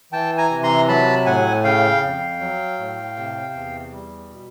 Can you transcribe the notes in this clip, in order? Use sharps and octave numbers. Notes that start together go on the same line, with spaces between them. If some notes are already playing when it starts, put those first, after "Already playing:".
E3 G5 A5
G#5 A#5
C3
A#5 C6
F#3 A5 B5
A2 F#5 G#5
C#3 F5 G5
F2
F#3
A2
C3
E2
G3
B2